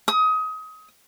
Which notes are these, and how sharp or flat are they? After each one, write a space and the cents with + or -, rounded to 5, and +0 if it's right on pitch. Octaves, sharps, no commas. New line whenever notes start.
D#6 +25